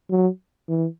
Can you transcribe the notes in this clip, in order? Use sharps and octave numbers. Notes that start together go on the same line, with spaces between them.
F#3
E3